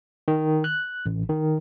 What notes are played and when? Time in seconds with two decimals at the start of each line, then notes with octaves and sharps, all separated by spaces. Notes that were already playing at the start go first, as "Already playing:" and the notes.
0.28 D#3
0.64 F#6
1.06 A1
1.29 D#3